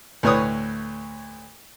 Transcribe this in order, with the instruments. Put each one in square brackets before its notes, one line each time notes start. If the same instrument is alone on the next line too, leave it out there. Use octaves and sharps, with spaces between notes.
[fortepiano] D2 A2 B4 C#5 C#6 D#6